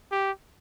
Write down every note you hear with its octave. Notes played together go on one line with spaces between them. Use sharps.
G4